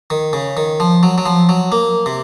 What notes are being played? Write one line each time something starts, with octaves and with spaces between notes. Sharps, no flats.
D#3
C#3
D#3
F3
F#3
F#3
F3
F#3
A#3
C3